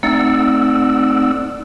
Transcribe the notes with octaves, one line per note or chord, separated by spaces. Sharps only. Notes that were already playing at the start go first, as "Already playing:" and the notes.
A3 C4 D#4 D5 F#5 E6